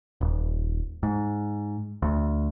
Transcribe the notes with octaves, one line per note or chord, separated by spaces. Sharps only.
D#1
G#2
D2